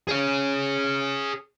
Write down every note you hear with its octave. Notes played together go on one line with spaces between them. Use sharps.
G#4 C#5